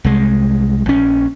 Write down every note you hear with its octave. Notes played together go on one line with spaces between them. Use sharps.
C2 G#3
A#1 C#4